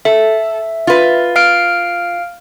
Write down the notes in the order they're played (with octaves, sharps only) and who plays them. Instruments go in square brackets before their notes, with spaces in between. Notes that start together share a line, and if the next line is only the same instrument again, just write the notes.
[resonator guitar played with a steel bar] A4 [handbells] E5
[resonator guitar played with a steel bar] F4 B4
[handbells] F5 F6 D7